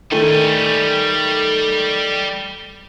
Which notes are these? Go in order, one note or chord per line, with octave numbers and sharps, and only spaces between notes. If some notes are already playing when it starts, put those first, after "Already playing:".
D#3 G3 A3 G#5